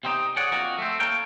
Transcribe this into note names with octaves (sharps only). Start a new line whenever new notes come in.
C3 C4 D#4 G4
G#4 C#5 D5 F#5
F2 A#3 D#4 F#4
A3 C4
A#3 A4 A#4 C#5 G5